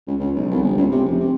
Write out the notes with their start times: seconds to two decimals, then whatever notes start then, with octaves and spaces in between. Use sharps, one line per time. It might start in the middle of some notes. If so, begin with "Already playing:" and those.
0.07 C#2
0.19 C#2
0.36 B1
0.51 C2
0.62 G1
0.78 C#2
0.91 C3
1.05 F1
1.20 C3